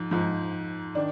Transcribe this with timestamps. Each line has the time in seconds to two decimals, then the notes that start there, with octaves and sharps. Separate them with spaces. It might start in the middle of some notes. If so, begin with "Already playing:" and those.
Already playing: G#2 F3
0.11 G#2 F3
0.95 D#3 D4